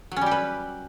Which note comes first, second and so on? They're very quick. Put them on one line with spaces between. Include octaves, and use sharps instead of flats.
F#3 C#4 G3 G4 B4